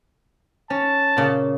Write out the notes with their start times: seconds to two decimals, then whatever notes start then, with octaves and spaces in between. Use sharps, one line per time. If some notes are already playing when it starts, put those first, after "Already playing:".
0.70 C#4 A5
1.17 A#2 C#3